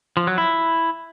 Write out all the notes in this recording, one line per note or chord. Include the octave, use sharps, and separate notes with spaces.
F3
F#3
E4